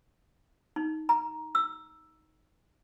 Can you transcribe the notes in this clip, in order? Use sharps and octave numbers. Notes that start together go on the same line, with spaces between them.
D#4
A#5
E6